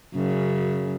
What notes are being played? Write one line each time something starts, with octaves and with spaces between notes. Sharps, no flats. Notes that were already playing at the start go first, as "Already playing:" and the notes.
F#2 C#3